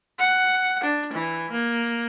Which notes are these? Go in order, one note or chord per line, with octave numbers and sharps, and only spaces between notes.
F#5
D4
E3
A#3